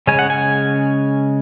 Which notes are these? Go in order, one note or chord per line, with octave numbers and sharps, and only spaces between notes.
C#3 G#3 C#4 G#5
F#5
G#5